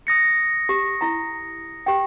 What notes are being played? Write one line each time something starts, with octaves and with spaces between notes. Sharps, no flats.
D#6 A#6 C#7
G4
E4 A#5
G4 G5